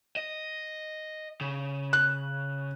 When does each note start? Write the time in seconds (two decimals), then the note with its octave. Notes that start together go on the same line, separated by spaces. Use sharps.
0.16 D#5
1.41 C#3
1.93 F#6